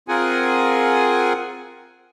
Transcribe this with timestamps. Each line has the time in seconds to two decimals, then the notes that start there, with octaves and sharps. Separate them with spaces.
0.08 C4 F4 G#4 A#4 F#5 G#5